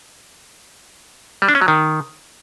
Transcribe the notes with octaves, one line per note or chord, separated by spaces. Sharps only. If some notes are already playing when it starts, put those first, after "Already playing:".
G3
D4
C#4
F#3
D#3